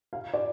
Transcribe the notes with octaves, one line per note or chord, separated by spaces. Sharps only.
F5
D5